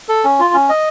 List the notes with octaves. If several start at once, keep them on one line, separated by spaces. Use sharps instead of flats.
A4
C#4
F4
C#4
D#5